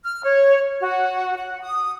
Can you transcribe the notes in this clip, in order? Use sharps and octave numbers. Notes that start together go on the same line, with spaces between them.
F6
C#5
F#4
F#5
D#6